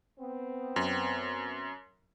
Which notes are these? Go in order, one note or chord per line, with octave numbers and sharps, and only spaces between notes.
B3 C4
F#2